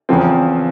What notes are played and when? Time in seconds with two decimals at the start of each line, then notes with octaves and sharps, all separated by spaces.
0.09 E2 C#3 F3 C4